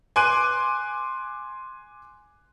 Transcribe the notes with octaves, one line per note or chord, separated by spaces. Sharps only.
G#5 C6 D6 F#6 D7 D#7